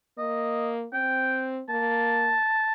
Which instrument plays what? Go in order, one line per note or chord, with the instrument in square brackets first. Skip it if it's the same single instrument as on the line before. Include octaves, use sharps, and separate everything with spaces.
[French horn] A#3 [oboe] D#5
[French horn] C4 [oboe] G5
[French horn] A#3 [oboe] A5